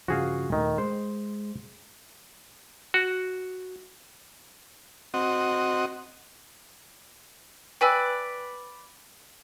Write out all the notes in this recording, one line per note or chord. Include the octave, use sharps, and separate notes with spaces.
G2 C#3 F3 F#4 G#4 F5
D#2 A#2 D#3 A3
G#3 C5
F#4
C4 F#4 D#5
B4 D5 G5 G#5 E6